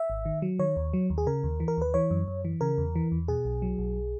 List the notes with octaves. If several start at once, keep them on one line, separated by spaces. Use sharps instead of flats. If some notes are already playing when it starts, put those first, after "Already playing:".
Already playing: E5
G#1
D#3
F#3
D#3 C#5
D#2
F#3
D#2
G#4
C#3 A#4
D#2
E3
A#4
D#2 B4
E3 C#5
F#2
F#2
E3
C#3 A#4
E2
E3
E2
B2 G#4
B1
F#3
B1